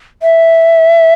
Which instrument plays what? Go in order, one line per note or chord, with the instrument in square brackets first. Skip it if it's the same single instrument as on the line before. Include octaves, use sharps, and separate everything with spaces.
[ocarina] E5